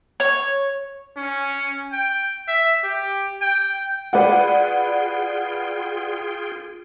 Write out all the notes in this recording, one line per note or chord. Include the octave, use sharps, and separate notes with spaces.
C#5
C#4
G5
E5
G4
G5
F4 G#4 B4 D5 F#5 G5